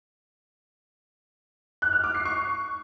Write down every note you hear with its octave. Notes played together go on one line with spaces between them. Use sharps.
F#6
F6
D6
C7
C#6